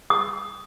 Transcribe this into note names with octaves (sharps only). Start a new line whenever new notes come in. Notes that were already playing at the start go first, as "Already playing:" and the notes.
D#6